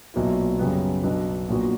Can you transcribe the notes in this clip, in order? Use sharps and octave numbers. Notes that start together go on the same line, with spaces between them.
B1 A#2 F#3 B3 E4
F#2 C#3 G3 B3
B1 B2 F#3 B3 D4
A#1 A#2 F#3 B3 F#4